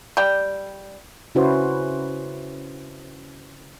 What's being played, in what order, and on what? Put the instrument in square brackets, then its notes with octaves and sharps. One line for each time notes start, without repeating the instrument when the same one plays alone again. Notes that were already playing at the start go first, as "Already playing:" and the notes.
[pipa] G3 D5 G5
[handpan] C#3 C#4 E4 F#4 B4 C5